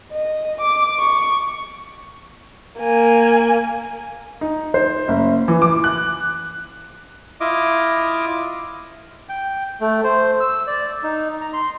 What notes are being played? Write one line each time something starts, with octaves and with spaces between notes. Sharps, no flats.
D#5
D6
C#6
A#3 G#5
D#4
C5
F#1
E3
D6
F#6
E4 F4 D#5 D6
G5
A3
C5
E6
D5
D#4
A#5
C6